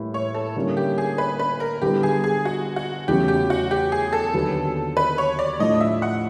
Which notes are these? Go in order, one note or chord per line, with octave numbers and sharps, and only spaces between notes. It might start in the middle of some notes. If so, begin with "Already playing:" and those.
Already playing: A2 E3 G3 A#3
C#5
A4
D3 G3 A#3 C#4 E4
G4
G#4
B4
B4
A#4
D3 G3 B3 E4 G4
G#4
G#4
F#4
F#4
E2 C#3 F#3 A3 C#4 G4
G4
F#4
G4
G#4
A4
D#2 D3 F#3 B3
B4
C#5
D5
A2 F3 A3 D4 D#5
E5
F#5